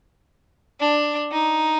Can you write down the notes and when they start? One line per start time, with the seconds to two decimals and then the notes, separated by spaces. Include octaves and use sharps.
0.80 D4
1.32 D#4